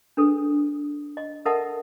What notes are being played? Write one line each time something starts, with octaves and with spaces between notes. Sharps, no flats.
D4 G#4 A4 B4
D#5
A4 A#4 D#5 E5 F#5 A5